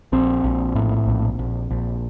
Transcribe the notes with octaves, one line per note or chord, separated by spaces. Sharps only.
A#1 C4
A#1
A2
A#1
A#1
A#1